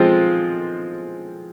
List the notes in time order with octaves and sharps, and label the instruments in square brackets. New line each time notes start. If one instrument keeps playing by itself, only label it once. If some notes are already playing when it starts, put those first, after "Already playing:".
Already playing: [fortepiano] F3 G#3 C4 F4